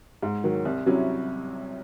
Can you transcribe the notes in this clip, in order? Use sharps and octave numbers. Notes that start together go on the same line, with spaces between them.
G#2
D#3 F#3
C2
C3 F#3 C#4 E4